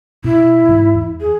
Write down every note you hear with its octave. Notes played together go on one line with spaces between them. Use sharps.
B2 E4
G#2 E3
E2
G#4